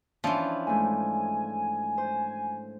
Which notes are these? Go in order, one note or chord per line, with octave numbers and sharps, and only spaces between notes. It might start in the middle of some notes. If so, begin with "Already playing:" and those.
E3 F3 C#4 D4 E4
G#2 A3 G#5
C5